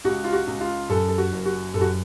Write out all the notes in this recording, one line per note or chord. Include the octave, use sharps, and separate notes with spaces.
C#2 F#4
F4
F#4
C#2
F4
F#2 A4
A4
F#4
F#1
F#4
F#2 A4
F#4